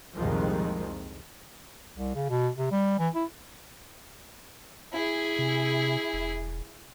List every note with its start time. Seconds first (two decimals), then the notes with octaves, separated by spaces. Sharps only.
0.15 C2 F2 A#2 D#3 F3 G#3
1.97 C2
2.15 C#3
2.29 B2
2.58 C3
2.71 G3
2.99 E3
3.15 E4
4.92 E4 G#4
5.39 C3
6.13 E1